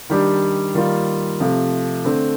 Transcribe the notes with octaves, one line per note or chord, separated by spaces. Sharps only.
D#3 G3 D4 G4
D#3 G3 A#3 F4
C3 F3 A3
D3 A3 C4